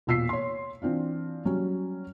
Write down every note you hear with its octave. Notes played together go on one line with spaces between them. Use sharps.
E1 A#2 E6 B6 C7
C#5 C6
E3 C4 D4 F4
F#3 G3 C#4